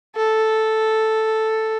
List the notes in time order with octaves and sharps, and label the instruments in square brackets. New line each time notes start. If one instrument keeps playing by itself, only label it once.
[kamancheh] A4